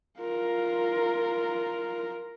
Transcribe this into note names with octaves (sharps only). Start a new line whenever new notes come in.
F4 A#4